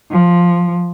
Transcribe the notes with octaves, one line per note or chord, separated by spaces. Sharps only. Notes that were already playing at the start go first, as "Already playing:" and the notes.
F3